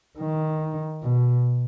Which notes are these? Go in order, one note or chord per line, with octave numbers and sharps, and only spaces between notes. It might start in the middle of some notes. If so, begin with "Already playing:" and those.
D#3
B2